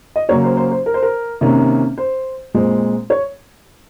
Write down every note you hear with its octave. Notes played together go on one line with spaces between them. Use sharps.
D#5
C#3 F#3 A#3 C#4 C#5
C5
C5
C5
A#4
C5
A#4
C3 D#3 A#3 C#4
C5
A#2 G#3 C4
C#5